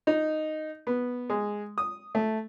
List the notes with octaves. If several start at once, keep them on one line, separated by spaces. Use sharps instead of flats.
D#4
B3
G#3
D#6
A3